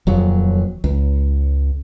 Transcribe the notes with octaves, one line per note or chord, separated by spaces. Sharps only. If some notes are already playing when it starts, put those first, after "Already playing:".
D#1 F2 F#3
C#2